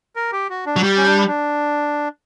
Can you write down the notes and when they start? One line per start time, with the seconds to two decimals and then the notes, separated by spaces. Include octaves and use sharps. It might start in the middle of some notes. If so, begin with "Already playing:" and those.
0.16 A#4
0.32 G4
0.50 F#4
0.66 D4
0.76 F#3
0.83 G3
0.97 C#4
1.06 D4
1.28 D4